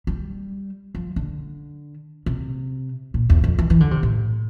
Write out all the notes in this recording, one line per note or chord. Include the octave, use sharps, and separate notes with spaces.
G3
F3
D3
C3
A#2
E2
F2
E3
E3
D3
C3
A2